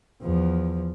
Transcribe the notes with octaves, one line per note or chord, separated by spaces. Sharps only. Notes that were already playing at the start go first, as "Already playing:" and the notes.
E2 F3